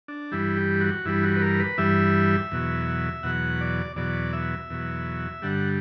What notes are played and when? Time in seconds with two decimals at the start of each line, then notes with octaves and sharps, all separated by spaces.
0.08 D4
0.32 G2 E3 G3 E4
0.57 G4
0.81 F#4
1.05 G2 E3 G3 E4
1.23 F#4
1.37 B4
1.42 A#4
1.60 B4
1.78 G2 E3 G3 E5
2.51 E2 B2 F#3
3.23 E2 B2 F#3 F#5
3.61 D5
3.96 E2 B2 F#3 D5
4.33 E5
4.70 E2 B2 F#3
5.42 G2 D3 G3 F#5